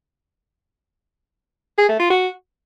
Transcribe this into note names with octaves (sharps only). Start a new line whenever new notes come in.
G#4
A3
F4
F#4